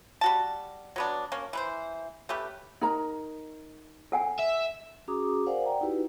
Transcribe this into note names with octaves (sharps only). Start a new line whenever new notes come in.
G3 F#4 A5
F#3 B3 D4
A#3 C#4
E3 B4 C5
A3 C#4 G4 B4
D#4 A#4 A#5
A4 F#5 G#5
E5
C#4 F#4 G#4 A#5 D6 D#6
A#4 C5 D5 F5 F#5 G#5
D5 F#5 G5 A#5
D#4 E4 F#4 G4 B4